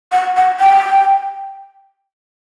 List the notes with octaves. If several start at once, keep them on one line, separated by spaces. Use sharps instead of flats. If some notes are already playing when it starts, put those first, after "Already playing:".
F#5
F#5
G5